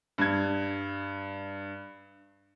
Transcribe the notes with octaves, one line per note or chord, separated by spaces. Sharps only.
G2 G#6